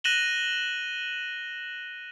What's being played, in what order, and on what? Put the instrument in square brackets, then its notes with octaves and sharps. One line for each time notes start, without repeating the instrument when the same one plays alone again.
[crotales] F#6 A#6 D#7 E7 F#7 G7